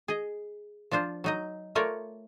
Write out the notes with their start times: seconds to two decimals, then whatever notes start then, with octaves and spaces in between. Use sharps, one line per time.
0.08 G#4 D#5
0.91 F3 D4 F4 C5
1.24 F#3 D#4 D#5
1.75 A3 F4 A#4 C#5 D5